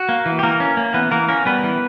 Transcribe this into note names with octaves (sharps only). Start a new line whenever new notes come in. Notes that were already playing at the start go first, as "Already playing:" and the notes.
Already playing: F#4
A#3
E3
G4
E3 A#3 A#4
C#4
A#3
E3 B3 B4
E3 A#3 A#4
A#3 C#4 A#4
G3 B3 B4
E3